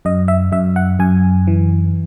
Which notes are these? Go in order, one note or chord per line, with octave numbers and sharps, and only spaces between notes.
F#2 D#5
E5
F#2 E5
F#5
F#2 G#5
E3